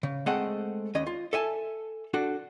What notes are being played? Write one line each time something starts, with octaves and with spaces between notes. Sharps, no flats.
C#3
G#3 A3 C4 A4 D#5 F#5
D#2 C#4 D#5
F4
A4 E5 G#5 A5
D4 F#4 A4